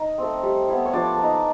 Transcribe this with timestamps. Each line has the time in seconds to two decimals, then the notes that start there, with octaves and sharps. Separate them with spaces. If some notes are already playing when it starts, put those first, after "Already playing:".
Already playing: D#4
0.18 A3 C4
0.43 G3
0.68 B3 E4
0.86 C#5
0.93 F3 D4 D5
1.18 A#3 D#4